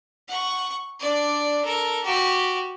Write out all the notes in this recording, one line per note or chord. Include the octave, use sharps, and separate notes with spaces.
F#5 C#6
D4 D5
A4 A#4
F#4 G4